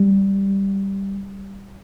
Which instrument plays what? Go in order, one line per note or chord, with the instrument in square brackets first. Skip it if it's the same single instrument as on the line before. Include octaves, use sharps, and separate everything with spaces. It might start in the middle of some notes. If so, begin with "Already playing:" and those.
Already playing: [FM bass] G3